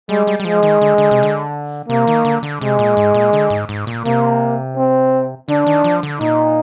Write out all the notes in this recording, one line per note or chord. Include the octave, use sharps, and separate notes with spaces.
G3 G#3
G3
G3
F3 G#3
D#3
D3
D3
C3
D3
C3 A#3
D#3
D3
D3
C3 G#3
A#2
G#2
A#2
D3
G#2
G#2
A#2
C3 A#3
C4
D3 D4
D#3
F3
D3
A#2 D#4